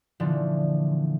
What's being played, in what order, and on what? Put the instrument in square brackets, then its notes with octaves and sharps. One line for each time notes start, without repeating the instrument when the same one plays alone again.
[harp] A#2 D3 E3 F3